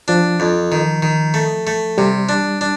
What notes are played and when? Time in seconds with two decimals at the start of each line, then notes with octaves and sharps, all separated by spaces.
0.08 F3 D4
0.40 F2
0.72 D#3
1.02 D#3
1.34 A3
1.67 A3
1.98 C3 G3
2.29 D4
2.61 D4